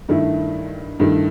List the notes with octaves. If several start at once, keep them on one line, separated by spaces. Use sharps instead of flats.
G2 D#3 A3 E4
G2 D#3 A3 E4